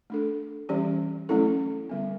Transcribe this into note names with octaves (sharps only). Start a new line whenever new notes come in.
A3 D4 A4
E3 G3 C#4 G4 D5
F#3 A3 C#4 E4 A4
D3 G3 B3